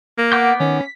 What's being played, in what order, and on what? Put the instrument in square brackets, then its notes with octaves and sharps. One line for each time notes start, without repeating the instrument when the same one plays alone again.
[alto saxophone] A#3
[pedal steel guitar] B3 D6 G6 [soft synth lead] F#5
[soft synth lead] D#3 [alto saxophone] C#4
[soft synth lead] B6